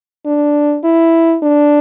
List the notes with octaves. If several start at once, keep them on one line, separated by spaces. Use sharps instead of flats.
D4
E4
D4